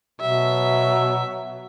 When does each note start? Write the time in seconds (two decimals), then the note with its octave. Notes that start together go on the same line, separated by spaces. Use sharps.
0.21 B2 F#3 E5